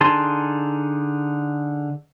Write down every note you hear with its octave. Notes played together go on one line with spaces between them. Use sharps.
D3 D#4 G#4 A5 C6